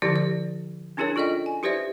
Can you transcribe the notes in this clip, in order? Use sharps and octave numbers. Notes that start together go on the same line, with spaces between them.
D3 F3 E4 G4 D5
D5
C#4 D4 E4 G#4 A#4 C#5
F4 A4 D5 D#5 G5
G#5
E4 G4 B4 C5 D5 E5